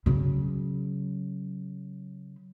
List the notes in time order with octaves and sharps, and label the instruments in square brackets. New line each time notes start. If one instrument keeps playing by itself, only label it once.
[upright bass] C#3 F#3